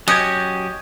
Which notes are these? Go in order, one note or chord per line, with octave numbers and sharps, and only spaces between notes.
F#3 C#4 G4 D#5 G#5 G6 G#6